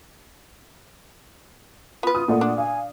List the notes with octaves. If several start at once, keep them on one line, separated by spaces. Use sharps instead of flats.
B3 F4 B4
F4 D#6
A#2 A3 D5 F#5
D4
F5 G#5